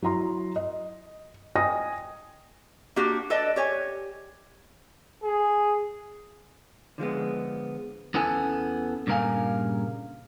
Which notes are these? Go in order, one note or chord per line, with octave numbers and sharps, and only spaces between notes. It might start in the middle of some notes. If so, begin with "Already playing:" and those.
F#3 E4 A#5 C6
D#5
D#5 G5 G#5 D#6 A#6
A#3 D4 F#4 G4
A4 B4 D5 D#5 A5
G4 C#5 G#5
G#4
D3 F3 G#3 B3
E2 B3 C#4 A4 G#5
G2 A#2 C#3 A#4 F5 G#5